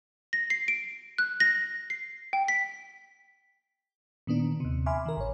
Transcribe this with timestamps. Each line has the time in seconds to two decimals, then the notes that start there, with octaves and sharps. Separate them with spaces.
0.33 A#6
0.50 C7
0.68 D7
1.18 F#6
1.40 A#6
1.90 C7
2.33 G5
2.48 B6
4.27 A#2 D#3 B3 D4
4.60 D#2 C3
4.86 E5 G#5 B5 C6 D6 F6
5.06 D#3 A#4
5.17 A1 C#5